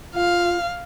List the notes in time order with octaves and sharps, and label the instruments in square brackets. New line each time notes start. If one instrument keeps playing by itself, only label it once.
[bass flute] F4 [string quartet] F5